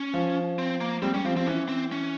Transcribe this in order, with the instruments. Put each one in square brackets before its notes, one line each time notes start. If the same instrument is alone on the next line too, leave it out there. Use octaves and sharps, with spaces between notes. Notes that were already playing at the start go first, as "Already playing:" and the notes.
Already playing: [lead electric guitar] C#4
[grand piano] F3
[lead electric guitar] C4
A#3
[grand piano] G3 [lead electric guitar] C4
[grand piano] G3 [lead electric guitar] C#4
[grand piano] F3 [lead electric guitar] C4
[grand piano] F3 [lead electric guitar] C4
[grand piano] E3 [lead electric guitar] C#4
[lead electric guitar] C4
C#4